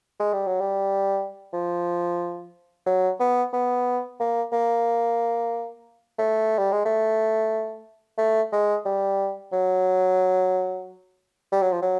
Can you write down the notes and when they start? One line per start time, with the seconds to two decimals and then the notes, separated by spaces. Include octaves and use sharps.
0.20 G#3
0.33 G3
0.47 F#3
0.61 G3
1.53 F3
2.86 F#3
3.20 B3
3.53 B3
4.20 A#3
4.52 A#3
6.19 A3
6.58 G3
6.72 G#3
6.85 A3
8.18 A3
8.52 G#3
8.85 G3
9.53 F#3
11.52 G3
11.62 F#3
11.72 F3
11.82 F#3